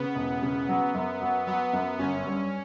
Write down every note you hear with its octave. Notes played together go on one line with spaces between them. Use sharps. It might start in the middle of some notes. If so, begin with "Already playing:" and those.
Already playing: C#3 B3
E1
C#3
F#3
F#2
F#3
F#3 B3
F#2
G1 C#4
G2